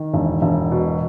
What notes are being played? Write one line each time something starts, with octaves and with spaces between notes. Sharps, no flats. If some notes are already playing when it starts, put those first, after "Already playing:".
Already playing: D#3
E1
E1
B2